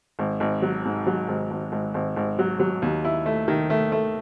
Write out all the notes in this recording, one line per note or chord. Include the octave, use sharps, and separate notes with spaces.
G#1
G#1
F#3
G#2
F#3
G#1
G#1
G#1
G#1
G#1
F#3
F#3
D#2
E4
A3
D#3
A3
A3